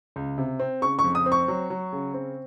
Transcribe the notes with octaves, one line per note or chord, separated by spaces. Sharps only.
C#2
C3
C4
C#3 C#6
C#6
F2
D#6
C4
C#6
F#3
F#3
C#3
C4